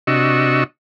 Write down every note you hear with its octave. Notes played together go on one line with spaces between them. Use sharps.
C3 D4 F#4 D#5 C#6 E6